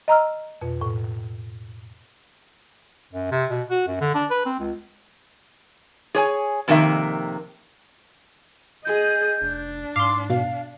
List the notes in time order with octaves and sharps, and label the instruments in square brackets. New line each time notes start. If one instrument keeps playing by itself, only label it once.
[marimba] D#5 A#5 E6 F6
F2 B2
A2
[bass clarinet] F#2
C3
B2
F#4
F#2
D3
D4
B4
C4
C#2
[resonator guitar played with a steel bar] G#4 C#5 G#5
F2 C3 D#3 A#3 E5 A#5
[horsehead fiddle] G#4 D#5 [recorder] G6
[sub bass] F1 [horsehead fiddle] D4
[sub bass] G#2 [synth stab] F5 C6 [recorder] D6
[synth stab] B2 [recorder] F5